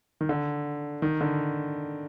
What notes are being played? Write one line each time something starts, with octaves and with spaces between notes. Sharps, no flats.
D#3
D3
D#3
D3